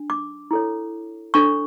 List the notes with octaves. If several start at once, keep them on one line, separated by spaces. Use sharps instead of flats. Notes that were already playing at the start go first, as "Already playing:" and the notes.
Already playing: D4
D6
E4 A4 C#5
D4 A4 C#5 C#6